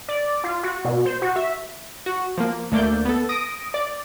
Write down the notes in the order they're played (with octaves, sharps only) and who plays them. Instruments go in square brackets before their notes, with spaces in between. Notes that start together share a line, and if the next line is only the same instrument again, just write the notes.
[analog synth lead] D5
F4
F#4
B2
C5
F#4
E5
[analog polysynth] F#4
F3 A#3
D2 A3 A#3 D5 G6
B3 A4
D#6 A#6 D7
D5